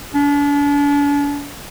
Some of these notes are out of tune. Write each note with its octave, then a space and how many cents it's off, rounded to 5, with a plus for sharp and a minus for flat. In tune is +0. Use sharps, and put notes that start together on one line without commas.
D4 -40